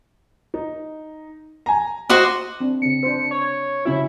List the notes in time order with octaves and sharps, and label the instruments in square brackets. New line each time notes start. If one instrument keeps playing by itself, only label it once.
[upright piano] D#4
G#5 A#5
[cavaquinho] F#4 C5 D#5 [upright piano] D6
[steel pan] C4 D4
[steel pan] C#3 C4 [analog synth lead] C#7
[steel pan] D4 C5
[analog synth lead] C#5
[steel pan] C#3 C#4 F#4 [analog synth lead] E4